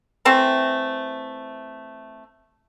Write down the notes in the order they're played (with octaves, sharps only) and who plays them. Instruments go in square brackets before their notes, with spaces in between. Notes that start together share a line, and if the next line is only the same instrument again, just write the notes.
[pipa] E3 A3 C4